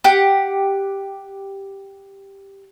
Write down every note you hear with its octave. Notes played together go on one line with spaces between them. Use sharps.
G4 F#5